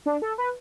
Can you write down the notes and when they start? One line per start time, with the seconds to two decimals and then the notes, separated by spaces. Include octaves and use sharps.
0.06 D4
0.22 A4
0.38 B4